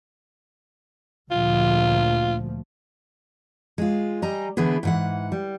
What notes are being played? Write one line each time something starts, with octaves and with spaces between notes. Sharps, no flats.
D2 A#2 F3 F4
G#3 F4
G3 D#5 G#5 A#5
D3 E3 B3 G#4
G#2 E3 F#5
G3